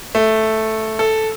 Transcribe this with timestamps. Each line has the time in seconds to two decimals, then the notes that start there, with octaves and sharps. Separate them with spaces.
0.15 A3
0.99 A4